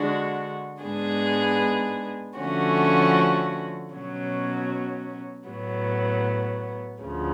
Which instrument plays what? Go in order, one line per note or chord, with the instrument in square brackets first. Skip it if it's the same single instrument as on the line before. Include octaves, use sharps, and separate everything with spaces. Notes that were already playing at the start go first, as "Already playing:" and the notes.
Already playing: [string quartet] D3 G#3 D4 F#4
G#2 G#3 B3 D4 G#4
D3 F3 A3 C#4 F#4
B2 F#3 C#4
A2 F#3 B3
D2 C#3 F3